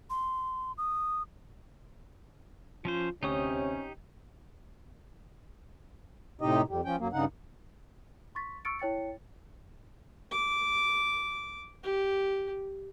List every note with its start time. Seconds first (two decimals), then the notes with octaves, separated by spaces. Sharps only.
0.10 C6
0.78 D#6
2.85 F3 C#4 F4 C5
3.23 D2 C3 C#4 D#4 G4 C#5 C#6 D#6
6.41 A2 C3 D#4 G4 D#5
6.68 F2 G3
6.85 F3 C#4 G5
6.99 F#2 F#3 A#3
7.13 G2 C#3 D#4 F#5
8.35 C6 C#6 A6 B6
8.65 C#6 E6 F6 A6 C#7 D7
8.79 E4 C#5 G5 A6 C#7
10.31 D6
11.83 G4